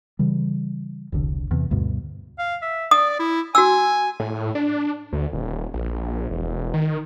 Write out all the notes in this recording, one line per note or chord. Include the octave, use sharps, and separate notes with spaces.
C#3 E3 G3
E1 C2 D3
E2 C3
D2 G2 B2
F5
E5
D5 D#6
E4
F#4 G#5 E6
A2
D4
D2
D#1
A#1
E1
D#3